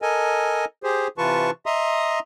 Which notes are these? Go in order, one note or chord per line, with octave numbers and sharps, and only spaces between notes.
A4 A#4 D#5 G#5
G4 G#4 C5
C3 E3 F4 B4 A5 C#6
D#5 E5 A#5 C6 D#6